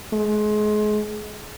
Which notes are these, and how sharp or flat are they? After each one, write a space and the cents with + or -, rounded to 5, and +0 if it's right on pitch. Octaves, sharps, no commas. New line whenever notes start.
G#3 +30